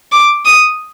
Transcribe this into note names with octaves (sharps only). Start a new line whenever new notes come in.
D6
D#6